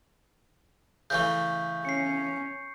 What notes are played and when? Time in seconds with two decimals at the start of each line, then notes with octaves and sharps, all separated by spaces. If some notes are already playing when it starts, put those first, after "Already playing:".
1.10 C#3 E3 A3 C#6 G6
1.85 C#4 C7 C#7